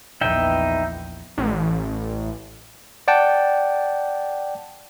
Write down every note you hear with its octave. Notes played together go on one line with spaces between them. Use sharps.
A#1 E2 D#4 E5 G5
A1
D5 F#5 G5 A5